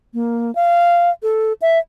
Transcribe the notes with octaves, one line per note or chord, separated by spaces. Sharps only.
A#3
F5
A4
E5